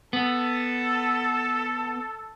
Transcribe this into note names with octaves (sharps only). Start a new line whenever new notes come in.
B3 A4